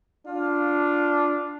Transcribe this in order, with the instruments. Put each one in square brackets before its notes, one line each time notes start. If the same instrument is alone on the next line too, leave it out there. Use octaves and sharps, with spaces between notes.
[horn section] D4 F4